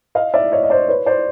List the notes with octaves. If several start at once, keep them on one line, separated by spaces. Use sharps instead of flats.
D#5 F5
D5 E5
C#5 D#5
D#5
C5 D5
B4 C#5
C5 D5